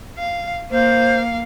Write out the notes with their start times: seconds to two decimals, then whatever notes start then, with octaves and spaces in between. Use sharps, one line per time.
0.18 F5
0.71 A#3 C5 F5